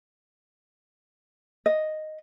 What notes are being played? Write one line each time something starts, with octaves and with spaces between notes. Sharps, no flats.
D#5